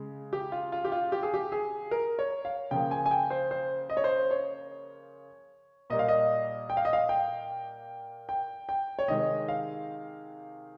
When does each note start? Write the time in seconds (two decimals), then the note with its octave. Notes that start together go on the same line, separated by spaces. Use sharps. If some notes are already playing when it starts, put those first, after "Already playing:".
Already playing: C#3 G#3
0.33 G4
0.52 F4
0.72 F4
0.85 G4
0.92 F4
1.12 G4
1.23 G#4
1.34 G4
1.52 G#4
1.91 A#4
2.19 C#5
2.45 F5
2.71 C#3 F3 A#3 G5
2.91 G#5
3.06 G#5
3.11 G5
3.30 C5
3.51 C5
3.90 D#5
3.97 C#5
4.04 C5
4.31 C#5
5.90 A#2 G3 A#3 D#5
5.99 F5
6.08 D#5
6.70 G5
6.77 F5
6.85 D#5
6.93 F5
7.09 G5
8.29 G5
8.69 G5
8.99 C#5
9.08 C3 D#3 G#3 D#5
9.48 F5